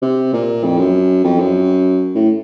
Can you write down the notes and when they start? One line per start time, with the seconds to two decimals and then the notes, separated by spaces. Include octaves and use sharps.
0.02 C3
0.33 A#2
0.64 F2
0.79 F#2
1.24 F2
1.40 F#2
2.15 A2